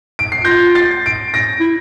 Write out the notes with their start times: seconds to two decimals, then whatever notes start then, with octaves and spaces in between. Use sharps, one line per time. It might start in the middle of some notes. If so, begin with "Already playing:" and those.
0.19 D7
0.32 C7
0.44 F4 G6 A#6
0.75 A6 C7
1.06 D7
1.34 A#6 D7
1.60 E4